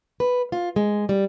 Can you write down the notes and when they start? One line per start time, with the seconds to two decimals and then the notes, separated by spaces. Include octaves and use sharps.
0.20 B4
0.52 F4
0.76 G#3
1.09 G3